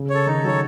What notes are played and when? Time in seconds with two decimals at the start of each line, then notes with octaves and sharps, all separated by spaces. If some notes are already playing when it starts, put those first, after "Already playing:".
Already playing: C#3
0.10 A4 C#5
0.27 D#3 D#4
0.43 F#3 A4 C#5